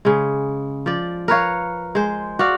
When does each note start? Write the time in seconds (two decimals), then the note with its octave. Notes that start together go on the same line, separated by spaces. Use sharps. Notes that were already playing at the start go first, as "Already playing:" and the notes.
0.05 C#3 G#3
0.86 F3 D5
1.28 A#4 B4 C#5 F5
1.95 G#3 C5
2.39 F#4 D5 F5